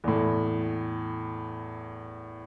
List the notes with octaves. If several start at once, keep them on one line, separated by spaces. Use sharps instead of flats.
E2 A2